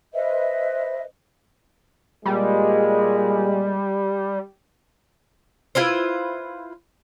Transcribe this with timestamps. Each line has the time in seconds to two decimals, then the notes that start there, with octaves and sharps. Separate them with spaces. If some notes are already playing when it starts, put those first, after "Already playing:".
0.14 B4 C5 D#5 E5
2.25 A#2 G3 G#3
5.75 E4 F4 B4 C5